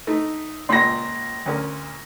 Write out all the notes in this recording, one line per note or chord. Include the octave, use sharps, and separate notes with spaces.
A3 D#4
C#2 A#2 B5 C6 A#6
D2 C#4 A#4